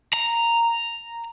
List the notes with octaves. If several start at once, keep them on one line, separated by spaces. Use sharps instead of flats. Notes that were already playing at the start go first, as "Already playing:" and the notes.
A#5